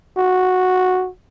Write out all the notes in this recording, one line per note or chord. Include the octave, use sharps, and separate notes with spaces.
F#4